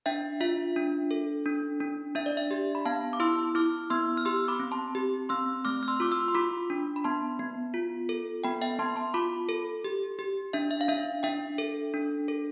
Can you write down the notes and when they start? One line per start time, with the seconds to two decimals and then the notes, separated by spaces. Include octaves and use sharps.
0.06 D4 E5 G5
0.41 F4 E5
0.76 D4
1.11 A4
1.46 D4
1.81 D4
2.15 D4 E5
2.26 D5
2.37 E5
2.51 G4
2.75 B5
2.85 B3 F5 A5
3.13 D6
3.20 E4 C6 E6
3.55 E4 D6 F6
3.90 B3 C6 E6
4.17 F6
4.25 G4 C6 E6
4.48 B5 D6
4.60 C4
4.71 A5 C6
4.95 G4
5.29 C4 C6 E6
5.65 A3 D6 F6
5.83 F6
5.88 C6 E6
6.00 F4 D6
6.11 C6 E6
6.28 C6
6.34 F4 B5 D6
6.70 D4
6.96 B5
7.04 B3 A5 C6
7.39 B3
7.74 F4
8.09 A4
8.44 B3 G5 B5
8.62 E5 G5
8.79 B3 A5 C6
8.96 A5 C6
9.14 F4 B5 D6
9.49 A4
9.84 G4
10.19 G4
10.53 D4 E5
10.71 E5
10.81 F5
10.88 D4 E5
11.23 D4 E5 G5
11.58 A4
11.94 D4
12.28 A4